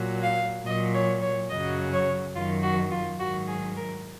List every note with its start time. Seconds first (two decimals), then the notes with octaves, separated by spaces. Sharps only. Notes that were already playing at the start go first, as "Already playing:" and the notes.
Already playing: A#2 F#3
0.23 F5
0.66 A#2 F#3 D#5
0.94 C#5
1.22 C#5
1.50 F#2 C#3 F#3 D#5
1.93 C#5
2.35 F#2 D#3 F#3 F4
2.63 F#4
2.92 F4
3.20 G#2 D#3 F#3 F#4
3.48 G#4
3.76 A#4